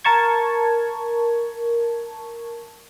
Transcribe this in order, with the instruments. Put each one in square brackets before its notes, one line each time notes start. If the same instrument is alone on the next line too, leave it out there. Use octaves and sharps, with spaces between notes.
[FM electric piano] A#4 A5 C#6 G#6